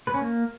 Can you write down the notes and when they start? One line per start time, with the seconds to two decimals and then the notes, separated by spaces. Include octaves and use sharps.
0.07 B4
0.14 C#4
0.21 A#3